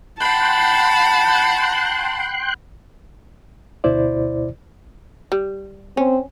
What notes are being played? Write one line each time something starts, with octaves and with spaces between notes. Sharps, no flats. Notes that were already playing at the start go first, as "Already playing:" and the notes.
F#5 G5 A5 B5 C6 F#6
D2 B2 E4 C5 D5
G3
C4 C#4